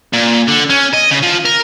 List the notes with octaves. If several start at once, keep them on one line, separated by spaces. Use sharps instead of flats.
A#2
D3
C#4
D#5
C#3
F3
A#4